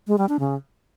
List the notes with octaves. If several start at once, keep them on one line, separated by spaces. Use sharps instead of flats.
G#3
G3
D4
C#3